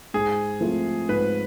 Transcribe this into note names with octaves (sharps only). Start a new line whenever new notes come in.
G#2 G#4
F3 A3 C4
G#2 B4